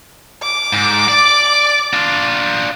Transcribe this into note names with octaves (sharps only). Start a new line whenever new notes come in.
D6
G#2
D5
D4 F4